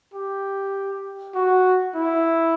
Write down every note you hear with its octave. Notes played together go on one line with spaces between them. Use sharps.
G4
F#4
E4